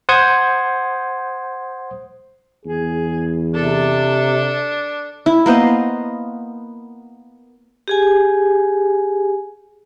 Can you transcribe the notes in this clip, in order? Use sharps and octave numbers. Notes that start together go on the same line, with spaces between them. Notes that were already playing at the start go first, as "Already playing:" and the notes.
C5 F#5 D#6 G6 G#6
E2 G#4
C3 D4 A4
E4
A#3 B3 C5 D#5
G4 G#4 G#5